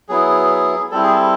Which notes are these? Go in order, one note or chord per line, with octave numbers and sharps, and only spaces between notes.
F#3 B3 E4 G#4
G3 C4 E4 A4
G#4
A4